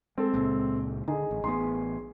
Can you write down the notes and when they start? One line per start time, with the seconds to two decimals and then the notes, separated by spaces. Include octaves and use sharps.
0.18 G#3 C4 A4
0.34 C#2 A#2 G#3
1.08 D3 D#4 G#4
1.31 A1
1.44 A1 B3 G#4 C6